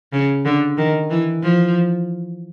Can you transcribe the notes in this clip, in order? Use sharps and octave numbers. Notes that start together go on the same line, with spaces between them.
C#3
D3
D#3
E3
F3